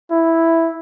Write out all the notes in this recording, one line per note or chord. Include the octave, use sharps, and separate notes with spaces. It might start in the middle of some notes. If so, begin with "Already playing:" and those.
E4